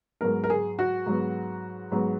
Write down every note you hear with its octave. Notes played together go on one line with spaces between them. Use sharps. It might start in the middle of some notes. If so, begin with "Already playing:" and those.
G#2 F#3 B3 A#4
A#4
G#4
F#4
G#2 F#3 B3
G#2 F#3 B3